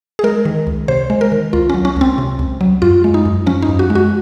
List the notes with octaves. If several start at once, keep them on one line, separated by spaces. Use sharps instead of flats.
G#4
G#3 A#4
D#3
C#2
C3 C5
G#3
A#4
D#3
C#2 F4
F#3 C#4
C#4
C#2 C4
C3
C#2
F#3
F#2 F4
G#3
D#4
F#2
F3 C#4
D#4
F#2
F#4
G#3
F#4